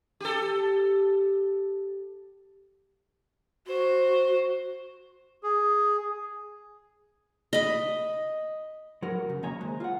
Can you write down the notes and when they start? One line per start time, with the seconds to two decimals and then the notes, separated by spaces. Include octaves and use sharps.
0.20 G4 A4
3.67 F#4 C5
5.43 G#4
7.53 D#5 B5
9.02 F#3 F#4 A#4
9.30 C#3
9.43 D#3 A#3 C#5 G#5 A#5
9.61 G#3 C5
9.80 F4 F#5